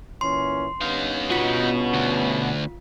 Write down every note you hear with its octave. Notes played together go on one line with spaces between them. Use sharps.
A#2 E3 C#4 C6
G2 B3 C#4 D#4 F5
B2 F4 F#4 B6
D2